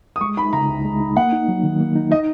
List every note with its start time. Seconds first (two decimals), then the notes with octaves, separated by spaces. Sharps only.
0.16 D#6
0.21 G#3 C#6
0.37 D#4 B5
0.53 C#3 A#5
0.69 C#2
0.85 G#3
1.00 D#4
1.16 A#3 F#5
1.33 D#4
1.48 F#3
1.64 D#3
1.80 A#3
1.96 D#4
2.11 D#4 D#5